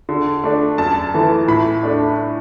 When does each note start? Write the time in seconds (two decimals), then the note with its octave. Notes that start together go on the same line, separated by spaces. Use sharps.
0.09 D3
0.44 A3 D4
0.78 F#2 A5
1.14 E3 A3
1.48 A2 B5
1.83 A3 D4